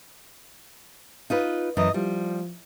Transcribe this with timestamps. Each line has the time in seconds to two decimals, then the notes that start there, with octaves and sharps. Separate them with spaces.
1.30 D#4 F4 B4
1.77 F#2 E3 D#5
1.94 F3 G3